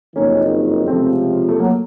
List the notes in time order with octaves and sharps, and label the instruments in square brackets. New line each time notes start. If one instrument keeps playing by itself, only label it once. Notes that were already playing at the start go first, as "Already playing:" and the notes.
[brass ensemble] F#1 F2 D#3 [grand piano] A#3 C#4
[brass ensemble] C#2 C3 F3 [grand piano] A3 C4
[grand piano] A3
F#3 A#3